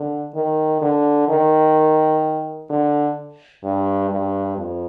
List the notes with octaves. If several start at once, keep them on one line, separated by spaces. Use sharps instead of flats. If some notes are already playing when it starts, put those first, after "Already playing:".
Already playing: D3
D#3
D3
D#3
D3
G2
G2
F2